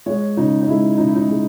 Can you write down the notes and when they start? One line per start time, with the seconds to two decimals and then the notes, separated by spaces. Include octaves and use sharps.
0.06 G#3 C#5
0.37 C#3 D#4
0.61 D#4
0.68 G#3 E4
0.97 C#3 D#4
1.07 E4
1.15 D#4
1.28 G#3